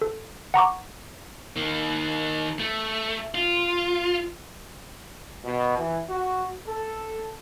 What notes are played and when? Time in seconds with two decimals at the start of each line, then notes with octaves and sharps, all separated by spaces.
0.02 A4
0.54 F#5 A#5 C#6 D6
1.56 D#3 A#3
2.59 A3
3.34 F4
5.45 B2
5.78 E3
6.09 F#4
6.68 A4